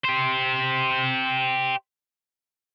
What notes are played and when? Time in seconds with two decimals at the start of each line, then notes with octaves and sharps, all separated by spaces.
0.04 G4 C5